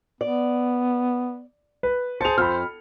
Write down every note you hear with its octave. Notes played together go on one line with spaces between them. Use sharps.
B3 D5
B4
G#4 C5 A5 C#7 F7
F2 B5 F6